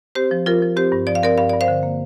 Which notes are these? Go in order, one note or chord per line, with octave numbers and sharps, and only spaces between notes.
C4 G4 C5
F3
F3 F4 A#4
F3
C4 G4 C5
G2
F3 D5
F5
C4 A#4 D5
G2 F5
G2 D5
C5 F5
D3
A#3